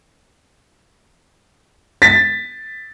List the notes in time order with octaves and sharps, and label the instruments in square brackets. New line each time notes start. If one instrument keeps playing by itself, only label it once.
[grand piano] A6 B6